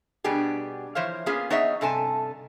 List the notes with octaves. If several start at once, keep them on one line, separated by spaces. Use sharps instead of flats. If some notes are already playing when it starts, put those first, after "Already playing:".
B2 G3 B3 D4 G4 G#4
E3 F3 C5 C#5 F5
A#3 B3 C#4 F4 G#4
B3 D#4 G#4 C#5 D#5 E5
G2 C3 A4 G#5 A5